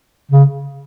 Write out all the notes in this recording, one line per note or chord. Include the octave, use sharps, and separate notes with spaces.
C#3